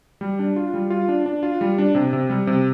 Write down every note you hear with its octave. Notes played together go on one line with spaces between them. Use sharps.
G3
D4
F4
G3
F4
D4
D4
F4
G3
D4
C3
C3
G3
C3